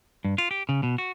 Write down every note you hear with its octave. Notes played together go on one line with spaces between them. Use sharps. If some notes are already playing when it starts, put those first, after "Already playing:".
G2
F4
G4
C#3
B2
F#4